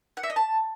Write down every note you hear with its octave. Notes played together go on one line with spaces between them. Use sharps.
F#5
E5
D#5
A5